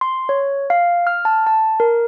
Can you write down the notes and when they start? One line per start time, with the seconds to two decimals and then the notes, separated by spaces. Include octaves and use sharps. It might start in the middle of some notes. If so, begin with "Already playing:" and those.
0.01 C6
0.29 C#5
0.70 F5
1.07 F6
1.25 A5
1.47 A5
1.80 A#4